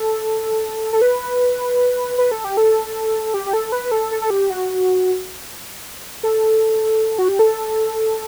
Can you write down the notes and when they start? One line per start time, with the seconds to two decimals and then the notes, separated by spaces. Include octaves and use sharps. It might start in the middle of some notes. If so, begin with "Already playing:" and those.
Already playing: A4
0.93 A4
1.02 B4
2.18 B4
2.31 A4
2.44 G4
2.57 A4
3.34 G4
3.46 G4
3.53 A4
3.72 B4
3.91 A4
4.11 A4
4.22 A4
4.30 G4
4.50 F#4
6.23 A4
7.18 F#4
7.28 G4
7.39 A4